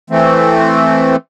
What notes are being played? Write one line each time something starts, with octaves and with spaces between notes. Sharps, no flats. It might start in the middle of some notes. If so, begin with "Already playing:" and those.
E3 A3 C4